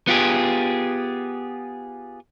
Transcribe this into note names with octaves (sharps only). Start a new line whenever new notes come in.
B3 F4 G4 G#4